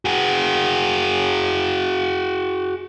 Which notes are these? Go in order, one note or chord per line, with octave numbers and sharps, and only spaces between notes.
F#4 G#4